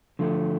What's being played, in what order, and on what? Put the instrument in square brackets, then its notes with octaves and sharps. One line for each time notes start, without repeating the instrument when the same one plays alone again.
[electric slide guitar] D3 F3 A3